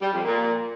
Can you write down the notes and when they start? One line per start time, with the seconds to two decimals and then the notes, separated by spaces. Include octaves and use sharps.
0.01 G3
0.12 F2
0.24 A#2